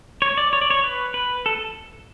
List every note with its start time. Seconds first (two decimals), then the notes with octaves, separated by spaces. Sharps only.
0.22 C#5
0.38 D5
0.53 C#5
0.61 D5
0.70 C#5
0.84 B4
1.14 B4
1.46 A4